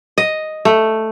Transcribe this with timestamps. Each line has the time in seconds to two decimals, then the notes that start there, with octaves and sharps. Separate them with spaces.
0.18 D#5
0.65 A3